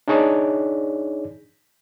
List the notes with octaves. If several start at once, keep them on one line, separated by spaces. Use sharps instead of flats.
D4 D#4 G#4 C#5 D5